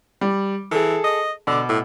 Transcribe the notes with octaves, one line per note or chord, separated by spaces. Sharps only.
G3
E3 G#4 A4
D#5
B2 D3 D6
A2